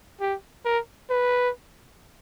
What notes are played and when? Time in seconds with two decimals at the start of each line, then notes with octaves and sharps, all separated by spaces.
0.21 G4
0.65 A#4
1.10 B4